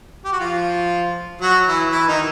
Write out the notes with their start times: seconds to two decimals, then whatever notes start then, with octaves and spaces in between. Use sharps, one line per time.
0.25 G4
0.32 F#4
0.40 F3 F4
1.41 F#3 F#4
1.66 E3 E4
1.91 E3 E4
2.08 D#3 D#4